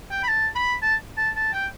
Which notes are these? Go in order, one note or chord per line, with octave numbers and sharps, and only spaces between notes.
G5
B5
A5
B5
A5
A5
A5
G5